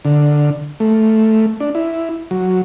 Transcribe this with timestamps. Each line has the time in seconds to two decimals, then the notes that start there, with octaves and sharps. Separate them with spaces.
0.05 D3
0.80 A3
1.60 D4
1.75 E4
2.31 F#3